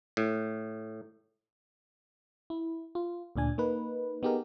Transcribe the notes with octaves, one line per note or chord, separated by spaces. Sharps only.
A2
E4
F4
D2 A#2 D4 G#5
A#3 D#4 B4
B3 D#4 G4 G#4 A#4